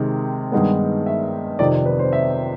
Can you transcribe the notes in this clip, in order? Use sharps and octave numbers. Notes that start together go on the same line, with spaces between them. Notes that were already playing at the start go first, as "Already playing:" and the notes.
Already playing: C3 D#3 G#3
G2 D#3 G#3 B3
E5
F2 C3 D#3 D5
B4
C5
E5